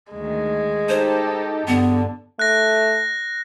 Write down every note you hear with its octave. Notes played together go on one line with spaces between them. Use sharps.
D2 D#3 G#3
D#4 G4 A4 C5
G2 D3 B3
A3 F#6 A#6